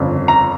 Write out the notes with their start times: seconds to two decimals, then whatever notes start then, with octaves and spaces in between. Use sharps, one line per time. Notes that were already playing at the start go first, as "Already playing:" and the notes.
Already playing: G1 F2 C#3
0.28 A#5